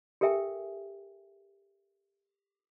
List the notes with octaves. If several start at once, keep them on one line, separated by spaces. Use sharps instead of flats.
G4 A4 A#4 E5 G5 G#5